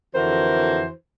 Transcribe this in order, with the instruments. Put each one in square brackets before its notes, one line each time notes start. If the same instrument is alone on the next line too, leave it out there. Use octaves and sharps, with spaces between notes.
[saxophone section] F2 D3 E3 F#4 A#4 C5